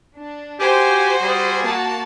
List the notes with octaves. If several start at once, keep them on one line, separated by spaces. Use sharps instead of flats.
D4
F#4 G4 C5 G#5
G3 G#4
A#3 F#4 A5